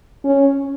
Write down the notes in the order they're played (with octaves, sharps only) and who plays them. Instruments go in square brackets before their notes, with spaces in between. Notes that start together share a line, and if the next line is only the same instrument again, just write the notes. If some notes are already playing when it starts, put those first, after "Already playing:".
[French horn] C#4